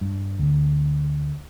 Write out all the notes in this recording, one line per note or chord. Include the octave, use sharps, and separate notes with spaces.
G2
D2